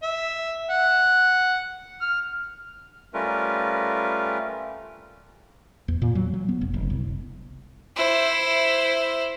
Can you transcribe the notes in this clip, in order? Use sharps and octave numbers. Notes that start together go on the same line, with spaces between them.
E5
F#5
F6
G3 A3 C#4 F4 A#4 B4
E2
A#2
F#3
F#3
B3
F1
F#1
C2
E4 C5